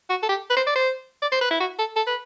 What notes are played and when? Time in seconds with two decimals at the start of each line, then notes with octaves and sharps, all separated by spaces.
0.10 F#4
0.23 A4
0.29 G4
0.50 B4
0.57 C5
0.67 D5
0.75 C5
1.22 D5
1.32 C5
1.41 B4
1.51 E4
1.60 F#4
1.79 A4
1.96 A4
2.07 B4